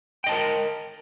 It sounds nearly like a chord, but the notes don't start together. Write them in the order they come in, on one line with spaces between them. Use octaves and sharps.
G5 D#5 A5 A#4